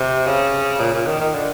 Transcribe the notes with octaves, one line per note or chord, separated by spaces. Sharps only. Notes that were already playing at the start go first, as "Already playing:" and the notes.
Already playing: C3
C#3
A#2
A#2
D#3
D#3
D3